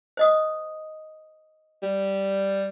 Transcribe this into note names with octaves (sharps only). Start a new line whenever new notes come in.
C5 D#5 D#6
G3